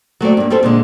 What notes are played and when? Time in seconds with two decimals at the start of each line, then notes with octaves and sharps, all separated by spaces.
0.21 F#3 A3 C4 D5
0.37 G2 A#3
0.50 G3 C4 F4 A4 C5
0.63 A#2 D3 G#3